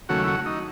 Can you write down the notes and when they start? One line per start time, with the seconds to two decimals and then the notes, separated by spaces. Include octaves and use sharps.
0.09 D#2 C#3 F#3 A3 F#4
0.24 E4
0.27 F#4
0.46 D#4